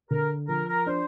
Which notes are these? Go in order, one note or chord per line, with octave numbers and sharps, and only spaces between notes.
D3 A#4
F3 A#4
A#4
D4 C5